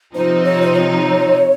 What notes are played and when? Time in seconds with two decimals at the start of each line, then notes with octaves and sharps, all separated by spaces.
0.15 C3 F3 C4 D#4 C5
0.44 C#5
0.62 C5
0.74 C#5